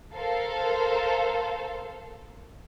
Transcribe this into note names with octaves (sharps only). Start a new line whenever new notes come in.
A4 A#4 C5 F5